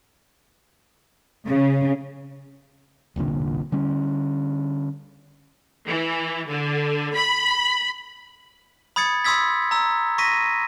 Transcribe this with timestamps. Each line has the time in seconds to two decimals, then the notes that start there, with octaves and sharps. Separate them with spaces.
1.48 C#3
3.16 E1 C2 A#2 D3
3.72 D3 G3 C#4
5.88 E3
6.50 D3
7.16 B5
8.96 B5 D#6 G#6 A6 C#7
9.24 B5 C6 D#6 E6 G#6 B6
9.71 A#5 E6
10.18 C#6 A#6 B6 D#7